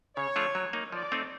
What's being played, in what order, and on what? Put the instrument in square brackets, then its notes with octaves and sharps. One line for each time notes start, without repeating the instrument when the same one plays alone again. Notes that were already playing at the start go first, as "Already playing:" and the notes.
[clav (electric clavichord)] C#3 [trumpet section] C#5
[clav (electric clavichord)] F3 A3 D4 F4
F#3
A#3 D#4
[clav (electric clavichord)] F3 [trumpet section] D5
[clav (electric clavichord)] A3 C4 D#4